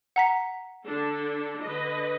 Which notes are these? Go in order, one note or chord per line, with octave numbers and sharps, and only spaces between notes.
F#5 A#5 B6
D3 D4 A4
D3 B4 D#5